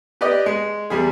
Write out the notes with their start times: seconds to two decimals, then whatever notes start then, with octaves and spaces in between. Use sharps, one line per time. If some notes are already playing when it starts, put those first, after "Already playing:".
0.21 G4 B4 D5 D#5
0.46 G#3
0.90 E2 G3 G#4